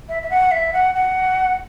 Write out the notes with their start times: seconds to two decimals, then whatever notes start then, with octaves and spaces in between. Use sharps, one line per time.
0.09 E5
0.23 E5
0.30 F#5
0.51 E5
0.73 F#5
0.95 F#5